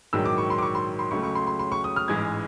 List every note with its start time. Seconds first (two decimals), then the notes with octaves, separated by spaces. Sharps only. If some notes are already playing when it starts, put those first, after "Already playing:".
0.13 A#1 G#2 D#3 F#3 E6
0.25 D6
0.38 C#6
0.50 C6
0.58 D6
0.62 C#6
0.75 C6
0.99 C6
1.11 C#2 C#3 F#3 A3 C#6
1.23 C#6
1.35 C6
1.47 C6
1.59 C6
1.72 C#6
1.84 D#6
1.96 F6
2.08 A1 G#2 E3 G#3 G#6